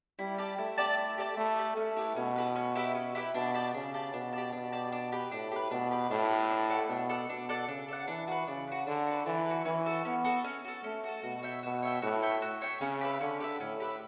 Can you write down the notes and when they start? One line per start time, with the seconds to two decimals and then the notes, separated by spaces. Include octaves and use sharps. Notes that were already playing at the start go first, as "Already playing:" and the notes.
0.19 G3 E4
0.38 G4 D5 A5
0.58 A3 E4
0.78 G4 D5 A5
0.98 E4
1.18 G4 D5 A5
1.37 A3 E4
1.57 G4 D5 A5
1.77 A3 C#4
1.97 E4 G4 B4
2.16 B2 C#4
2.36 E4 G4 B4
2.55 C#4
2.75 E4 G4 B4
2.95 C#4
3.15 E4 G4 B4
3.34 B2 D4
3.54 G4 D5 A5
3.74 C#3 D4
3.94 G4 D5 A5
4.13 B2 D4
4.33 G4 D5 A5
4.52 B2 D4
4.73 G4 D5 A5
4.92 D4
5.12 G4 B4
5.31 A2 D4
5.52 G4 B4
5.71 B2 D4
5.91 G4 B4
6.11 A2 D4
6.30 G4 B4
6.50 D4
6.69 A4 D5 F#5
6.89 B2 D4
7.09 A4 D5 F#5
7.29 B2 D4
7.49 A4 D5 F#5
7.68 C#3 D4
7.88 A4 D5 F#5
8.08 E3 D4
8.28 F#4 B4
8.47 C#3 D4
8.68 F#4 B4
8.87 D3 D4
9.06 F#4 B4
9.26 E3 D4
9.46 F#4 B4
9.65 E3 C#4
9.86 F#4 A4
10.05 B3 C#4
10.25 F#4 A4
10.44 C#4
10.65 F#4 A4
10.84 A3 C#4
11.04 F#4 A4
11.23 B2 F#4
11.43 C#5 E5 G5
11.63 B2 F#4
11.83 C#5 E5 G5
12.02 A2 F#4
12.22 C#5 E5 G5
12.42 F#4
12.62 C#5 E5 G5
12.81 C#3 C#4
13.01 G4 B4 E5
13.21 D3 C#4
13.40 G4 B4 E5
13.60 A2 C#4
13.80 G4 B4 E5